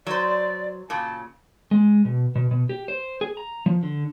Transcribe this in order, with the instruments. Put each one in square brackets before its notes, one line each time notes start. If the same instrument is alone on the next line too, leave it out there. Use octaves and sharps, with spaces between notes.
[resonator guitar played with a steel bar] F#3 C5 [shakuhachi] D5
[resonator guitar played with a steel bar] A#2 C#3 [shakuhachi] A5
[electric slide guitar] G#3
B2
B2
B2
G4
C5
G#4
A#5
F3
D3